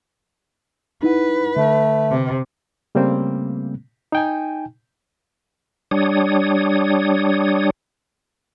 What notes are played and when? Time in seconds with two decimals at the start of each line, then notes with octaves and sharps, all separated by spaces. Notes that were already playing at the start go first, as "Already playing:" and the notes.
1.03 D#4 E4 B4 F#5
1.56 D3 A3
2.11 C3
2.95 C#3 G3 A3 A#3 C4
4.12 D#4 G5 G#5
5.91 G3 D4 C#5 D#6